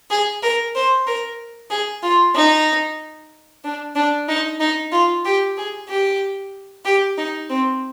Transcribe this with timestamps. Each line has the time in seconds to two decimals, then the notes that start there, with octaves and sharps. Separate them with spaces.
0.10 G#4
0.42 A#4
0.75 C5
1.07 A#4
1.71 G#4
2.03 F4
2.35 D#4
3.64 D4
3.95 D4
4.28 D#4
4.60 D#4
4.92 F4
5.25 G4
5.57 G#4
5.89 G4
6.85 G4
7.18 D#4
7.50 C4